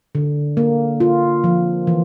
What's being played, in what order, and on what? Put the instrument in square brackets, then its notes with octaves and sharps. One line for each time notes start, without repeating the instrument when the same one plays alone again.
[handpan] D3
A#3
F4
F3
E3